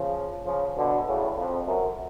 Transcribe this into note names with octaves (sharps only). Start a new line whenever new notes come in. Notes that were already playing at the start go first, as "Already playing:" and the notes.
Already playing: C#3 F3
C#3 F3
B2 D3
A2 C#3
F2
F#2